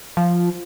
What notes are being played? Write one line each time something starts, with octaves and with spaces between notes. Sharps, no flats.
F3